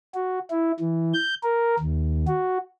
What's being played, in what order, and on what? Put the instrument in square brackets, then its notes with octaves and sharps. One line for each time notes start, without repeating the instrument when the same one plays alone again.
[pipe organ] F#4
E4
E3
G6
A#4
D#2
F#4